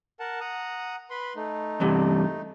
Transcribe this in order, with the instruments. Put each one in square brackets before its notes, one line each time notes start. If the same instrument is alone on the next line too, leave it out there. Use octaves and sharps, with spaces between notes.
[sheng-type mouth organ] A#4 F#5 A5
F#5 A#5 D#6
B4 B5 C6
A3 D#4
[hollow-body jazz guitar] E2 G2 C3